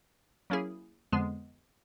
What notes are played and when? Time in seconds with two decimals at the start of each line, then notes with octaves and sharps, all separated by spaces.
0.50 F#3 A#3 C#4 E4 G#4
1.12 F2 D3 F3 G#3 B3